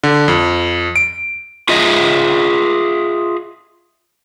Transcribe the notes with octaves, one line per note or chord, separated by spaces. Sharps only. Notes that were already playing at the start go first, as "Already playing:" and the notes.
D3
F2
D7
F4 G#4 D#5 E5